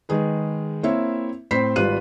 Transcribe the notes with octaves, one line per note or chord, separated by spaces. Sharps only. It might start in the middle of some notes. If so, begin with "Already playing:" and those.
D#3 G#3 G#4 B4
A#3 C4 E4 C#5 E5
A2 C4 C5 B5 B6 C7
G#1 G3 F4 B4 F#6 D#7